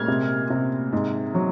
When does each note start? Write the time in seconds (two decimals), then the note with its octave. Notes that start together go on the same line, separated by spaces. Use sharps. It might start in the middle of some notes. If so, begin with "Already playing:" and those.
Already playing: A#2 G#3 F6 G#6
0.08 C3
0.50 C3
0.93 G#2
1.35 F#3